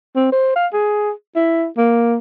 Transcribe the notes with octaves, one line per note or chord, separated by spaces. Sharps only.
C4
C5
F5
G#4
E4
A#3